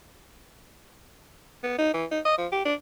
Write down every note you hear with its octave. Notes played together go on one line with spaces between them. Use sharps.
B3
D#4
E3
D#4
D#5
F3
G4
D4